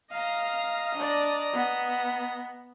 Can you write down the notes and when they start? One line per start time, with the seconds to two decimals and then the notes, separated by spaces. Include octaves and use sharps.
0.11 D#5 F5 A#5
0.95 D4 D5
1.53 B3